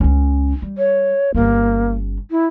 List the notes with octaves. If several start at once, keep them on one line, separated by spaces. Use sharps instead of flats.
C#2 C#4
G3
C#5
G1 A#3 C#4
E4